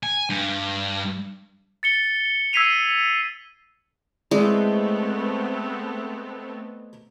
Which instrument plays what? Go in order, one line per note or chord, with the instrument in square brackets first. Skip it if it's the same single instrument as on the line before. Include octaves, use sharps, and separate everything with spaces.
[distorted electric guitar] G#5
G2
[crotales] A6 C#7 G7
E6 G#6 B6 C7 D#7 F7
[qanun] G#3 [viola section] A3 B3 C4 [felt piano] E4 D5 D#5